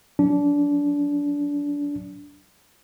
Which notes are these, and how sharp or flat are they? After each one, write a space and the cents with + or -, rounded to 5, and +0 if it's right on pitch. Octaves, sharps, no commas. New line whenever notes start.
F#3 +0 D4 -25